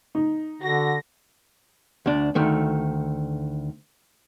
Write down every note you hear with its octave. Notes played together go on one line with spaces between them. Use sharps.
D#4
D3 F#4 A#6
D2 D4
D2 D#3 A3